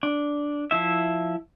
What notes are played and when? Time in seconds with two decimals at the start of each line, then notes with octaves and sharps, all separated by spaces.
0.03 D4
0.71 F3 E4 E5